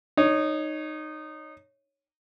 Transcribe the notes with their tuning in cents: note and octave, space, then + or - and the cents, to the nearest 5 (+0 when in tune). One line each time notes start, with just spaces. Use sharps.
D#4 -15 C#5 +0